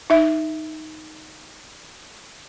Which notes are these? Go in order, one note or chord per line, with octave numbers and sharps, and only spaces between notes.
D#4 E5